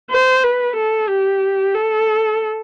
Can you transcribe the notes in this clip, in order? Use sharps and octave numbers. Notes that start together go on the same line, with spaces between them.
C5
B4
A4
G4
A4